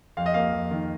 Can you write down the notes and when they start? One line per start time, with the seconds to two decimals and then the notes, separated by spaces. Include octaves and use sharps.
0.17 F2 F5
0.26 D#5
0.34 A#3 F5
0.52 F2
0.71 D#3